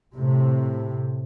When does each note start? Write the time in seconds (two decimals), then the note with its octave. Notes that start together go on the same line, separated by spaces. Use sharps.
0.16 A2 C3